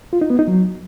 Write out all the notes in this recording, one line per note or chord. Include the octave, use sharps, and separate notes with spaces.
F4
D#4
B3
D#4
F#3